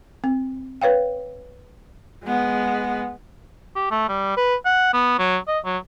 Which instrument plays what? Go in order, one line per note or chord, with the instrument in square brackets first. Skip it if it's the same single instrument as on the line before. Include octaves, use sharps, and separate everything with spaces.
[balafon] C4
B4 C#5 F5 G5
[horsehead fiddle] G#3 B3
[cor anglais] G4
A3
G3
B4
F#5
B3
F#3
D#5
F#3